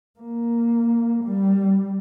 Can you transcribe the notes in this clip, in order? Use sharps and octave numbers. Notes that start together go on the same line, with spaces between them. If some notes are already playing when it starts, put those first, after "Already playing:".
A#3
G3